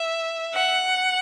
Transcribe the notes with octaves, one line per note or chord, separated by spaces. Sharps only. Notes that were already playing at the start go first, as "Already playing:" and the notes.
Already playing: E5
F#5